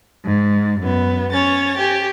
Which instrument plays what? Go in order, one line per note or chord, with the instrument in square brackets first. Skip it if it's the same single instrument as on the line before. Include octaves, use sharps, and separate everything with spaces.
[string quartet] G#2
F#2 B3
[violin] C#4 C#5 [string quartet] A6
[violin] G4 G#5